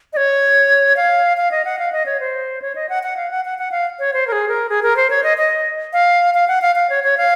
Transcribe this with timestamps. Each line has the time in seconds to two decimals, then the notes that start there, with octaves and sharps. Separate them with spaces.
0.13 D#5
0.17 C#5
0.96 F5
1.37 F5
1.51 D#5
1.65 F#5
1.79 F5
1.92 D#5
2.06 C#5
2.20 C5
2.62 C#5
2.75 D#5
2.89 F#5
3.03 F#5
3.17 F5
3.31 F#5
3.45 F#5
3.58 F#5
3.72 F5
3.99 C#5
4.13 C5
4.27 A#4
4.32 G#4
4.48 A#4
4.69 G#4
4.83 A#4
4.97 C5
5.10 C#5
5.23 D#5
5.38 D#5
5.93 F5
6.34 F5
6.48 F#5
6.62 F5
6.75 F5
6.90 C#5
7.04 C#5
7.17 F5